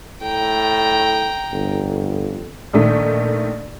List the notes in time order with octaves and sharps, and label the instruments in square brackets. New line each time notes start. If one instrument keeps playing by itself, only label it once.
[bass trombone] A2 [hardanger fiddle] G5 A#5
[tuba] G1 [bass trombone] F2
[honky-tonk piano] A#1 D#3 A3